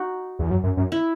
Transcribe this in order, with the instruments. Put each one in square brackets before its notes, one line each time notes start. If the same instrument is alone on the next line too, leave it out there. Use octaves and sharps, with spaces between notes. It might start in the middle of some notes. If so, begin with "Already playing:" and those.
Already playing: [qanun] D#4 F#4
[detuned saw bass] E2
F#2
F#2
F#2
[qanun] E4